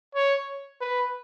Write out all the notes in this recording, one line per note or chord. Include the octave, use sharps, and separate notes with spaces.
C#5
B4